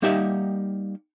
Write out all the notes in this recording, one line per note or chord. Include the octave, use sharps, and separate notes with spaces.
G3 A#3 D#4 G4 E5 F#5